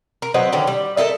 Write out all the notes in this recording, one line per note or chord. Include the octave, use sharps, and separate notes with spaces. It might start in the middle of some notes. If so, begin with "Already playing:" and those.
A#4
F#3 C4 B4 D#5
D3 D#3 F#3 C#4
G3
A4 A#4 D#5 E5